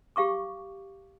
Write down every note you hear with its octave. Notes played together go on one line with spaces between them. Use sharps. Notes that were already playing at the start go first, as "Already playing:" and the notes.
G4 F5 C#6 D6